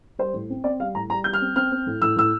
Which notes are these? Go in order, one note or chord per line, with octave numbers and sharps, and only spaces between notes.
G3 C5
A2
C4
C4 D5
G3 F5
A2 A#5
G3 A#5
G3 G6
F6
C4
C4 F6
C4
A2
A2 E6
A2 E6